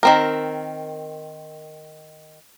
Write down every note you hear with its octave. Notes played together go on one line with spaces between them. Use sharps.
D#3 C4 A#4